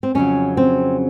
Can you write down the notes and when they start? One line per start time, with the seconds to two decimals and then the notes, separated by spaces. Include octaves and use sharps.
0.03 C4
0.15 F2 C#3 F#3 C#4
0.57 C4